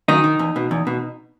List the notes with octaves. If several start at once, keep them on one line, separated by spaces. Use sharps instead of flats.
F#2 D#3 D#4
D#3
E2
B2
E2
B2